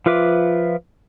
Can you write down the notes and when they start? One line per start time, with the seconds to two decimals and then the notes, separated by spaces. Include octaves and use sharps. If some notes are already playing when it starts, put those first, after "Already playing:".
0.06 F3 F4 B4 E5 D6